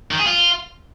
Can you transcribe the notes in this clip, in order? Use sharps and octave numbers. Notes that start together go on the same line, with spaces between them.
D#3
G#4
F4